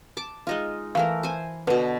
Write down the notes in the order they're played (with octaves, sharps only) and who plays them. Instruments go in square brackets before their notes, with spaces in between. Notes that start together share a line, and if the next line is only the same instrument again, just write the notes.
[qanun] A5 D6
G#3 D#4 F4
[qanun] E3 A3 A#4 [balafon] F5
[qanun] C5 G#5
[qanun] B2 D3 [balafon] B4